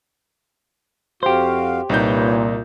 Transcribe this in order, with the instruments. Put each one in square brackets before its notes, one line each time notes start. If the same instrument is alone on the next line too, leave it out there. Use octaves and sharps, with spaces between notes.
[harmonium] F2 F#4 F5 [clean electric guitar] G4 C5
[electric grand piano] C2 D#4 G6 [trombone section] A#2 [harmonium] B4 C#5